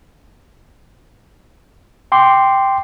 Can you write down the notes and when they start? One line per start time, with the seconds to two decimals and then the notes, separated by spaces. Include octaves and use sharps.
2.12 G5 C6 D6